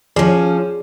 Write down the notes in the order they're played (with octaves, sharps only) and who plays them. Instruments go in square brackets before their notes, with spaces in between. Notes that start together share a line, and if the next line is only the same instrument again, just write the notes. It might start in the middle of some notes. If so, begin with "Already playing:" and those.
[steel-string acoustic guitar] F3 C#4 [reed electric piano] G#4 D5